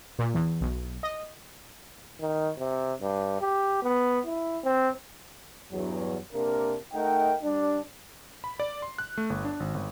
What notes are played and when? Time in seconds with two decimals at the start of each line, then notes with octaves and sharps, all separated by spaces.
0.19 A#2
0.34 E2
0.61 B1
1.03 D#5
2.20 D#3
2.58 C3
3.02 G2
3.41 G4
3.83 B3
4.26 E4
4.63 C4
5.72 E2 G2 F#3
6.33 C3 A#3 D4 A#4
6.94 A3 D#4 A#4 D#5 F#5 G5
7.43 G3 D4
8.44 B5
8.60 D5
8.82 C6
8.98 F#6
9.18 A3
9.30 G1
9.45 D4
9.60 G#1
9.74 G1